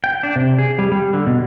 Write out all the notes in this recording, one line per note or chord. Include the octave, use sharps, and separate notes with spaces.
G5
D4
C3
G#4
G3
G3
D3
B2